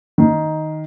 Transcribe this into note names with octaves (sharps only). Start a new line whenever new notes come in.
D#3